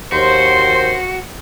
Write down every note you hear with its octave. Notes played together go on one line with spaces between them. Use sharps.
D#2 F#4 C5